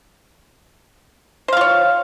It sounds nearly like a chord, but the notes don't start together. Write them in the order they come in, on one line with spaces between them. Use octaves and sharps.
C5 F5 F4 C#5